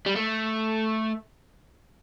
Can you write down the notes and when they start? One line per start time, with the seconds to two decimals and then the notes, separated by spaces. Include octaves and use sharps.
0.06 G3
0.16 A3